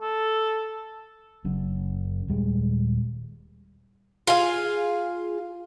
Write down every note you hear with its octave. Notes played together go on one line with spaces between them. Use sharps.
A4
F#1 F#2
D#1 G3 G#3
F4 G#4 F5